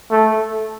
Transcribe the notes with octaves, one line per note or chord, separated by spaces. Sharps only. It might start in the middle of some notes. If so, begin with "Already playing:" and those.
A3